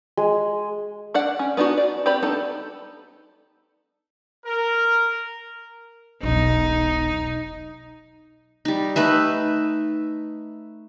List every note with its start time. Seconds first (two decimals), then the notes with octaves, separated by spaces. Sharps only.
0.17 G#3
1.14 D4 D5 F#5
1.39 C#4
1.57 B3 D4 D#4 F#4
1.78 D5
2.06 C4 G4 B4 D5 B5
2.23 B3 D4 D#4 A4
4.46 A#4
6.23 E1 B1 D#4
8.65 G3 D#4
8.96 A3 D#4 B4 E5